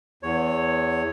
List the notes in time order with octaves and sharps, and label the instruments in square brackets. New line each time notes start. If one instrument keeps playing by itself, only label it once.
[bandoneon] E2 C#5